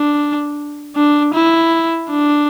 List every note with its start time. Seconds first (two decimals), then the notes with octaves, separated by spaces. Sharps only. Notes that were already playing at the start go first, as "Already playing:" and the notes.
Already playing: D4
0.96 D4
1.34 E4
2.10 D4